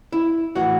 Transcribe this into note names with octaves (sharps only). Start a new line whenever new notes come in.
E4
A2 E3 F#4